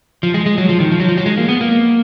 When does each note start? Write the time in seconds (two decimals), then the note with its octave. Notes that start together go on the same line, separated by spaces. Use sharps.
0.23 F3
0.34 G#3
0.46 G#3
0.58 F#3
0.69 F3
0.80 D#3
0.92 F3
1.00 F#3
1.09 F3
1.17 F#3
1.26 G#3
1.37 A#3
1.49 B3
1.61 A#3